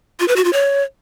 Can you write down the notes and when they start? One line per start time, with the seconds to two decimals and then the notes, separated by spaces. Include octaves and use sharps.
0.20 F4
0.28 B4
0.36 F#4
0.45 F4
0.53 C#5